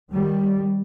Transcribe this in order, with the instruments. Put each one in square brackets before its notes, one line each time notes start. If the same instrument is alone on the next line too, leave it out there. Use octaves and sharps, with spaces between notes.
[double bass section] D#3 G3